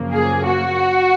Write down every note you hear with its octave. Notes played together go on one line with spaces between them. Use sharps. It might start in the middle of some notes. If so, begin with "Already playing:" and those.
Already playing: F#2 C#3 F3 A#3
G#4
F#4